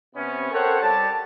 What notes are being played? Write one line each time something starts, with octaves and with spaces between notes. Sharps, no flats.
C3 B3 C#4
A4 A#4 C5 C#5 F#5 G5
G3 G4 A5